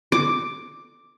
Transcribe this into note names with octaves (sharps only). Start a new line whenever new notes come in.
D6